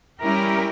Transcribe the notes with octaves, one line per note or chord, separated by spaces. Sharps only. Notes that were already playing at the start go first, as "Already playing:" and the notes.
G3 C#4 E4 G4 A#4